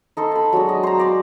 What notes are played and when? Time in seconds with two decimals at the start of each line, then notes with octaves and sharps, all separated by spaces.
0.17 D#4 A4 C5
0.31 A5 B5
0.53 F#3 G#3 D4
0.69 D#5
0.83 C5 A#5
0.98 C5 D5 C6